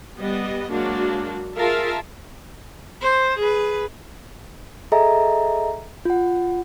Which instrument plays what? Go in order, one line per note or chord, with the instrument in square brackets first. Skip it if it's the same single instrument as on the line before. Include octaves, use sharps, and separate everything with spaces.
[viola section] G3 B3 D#5
F#3 G#3 A#3 D4 F#4
F4 G#4 A#4 E5 F5 A5
[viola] C5
G#4 B4
[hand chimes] G#4 A4 D#5 E5 G#5 A#5
F4 F#5